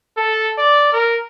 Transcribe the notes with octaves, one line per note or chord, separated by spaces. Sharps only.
A4
D5
A#4